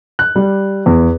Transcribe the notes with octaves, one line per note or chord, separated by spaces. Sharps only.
F#6
G3
E2